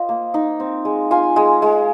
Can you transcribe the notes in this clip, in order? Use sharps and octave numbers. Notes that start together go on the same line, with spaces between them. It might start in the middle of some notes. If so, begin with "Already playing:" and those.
Already playing: F4 C5 D#5
A#3
D#4
C4
G#3
F4 G#5
G#3
G#3